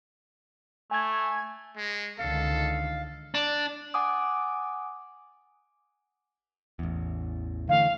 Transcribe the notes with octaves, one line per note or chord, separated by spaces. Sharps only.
A3 G#5 G#6
G#3
C#2 D3 D#3 A4 F5
D4
F#5 G#5 D6 D#6
A1 E2
D3 E3 A3 F5